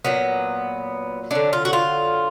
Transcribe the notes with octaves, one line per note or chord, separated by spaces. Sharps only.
A#2 F#3 B3
D3 F#3 D4
F4
F#4
F4